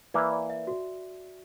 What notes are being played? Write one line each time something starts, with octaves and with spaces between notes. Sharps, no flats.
E3 A#3 E4 D5
D5
E5
F#4